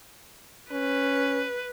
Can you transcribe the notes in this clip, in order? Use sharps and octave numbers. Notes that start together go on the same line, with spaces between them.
C#4 B4